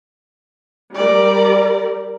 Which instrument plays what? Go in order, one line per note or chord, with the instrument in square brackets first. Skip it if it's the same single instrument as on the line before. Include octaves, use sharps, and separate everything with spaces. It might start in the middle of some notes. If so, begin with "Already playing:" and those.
[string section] G3 A#4 [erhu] D5